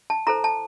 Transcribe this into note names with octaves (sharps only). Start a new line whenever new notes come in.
A5
E4 A4 C5 A#5
A5